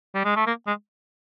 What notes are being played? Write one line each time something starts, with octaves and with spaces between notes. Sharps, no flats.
G3
G#3
A3
A#3
G#3